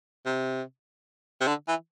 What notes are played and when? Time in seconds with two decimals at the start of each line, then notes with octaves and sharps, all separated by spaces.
0.26 C3
1.40 C3
1.47 D3
1.68 E3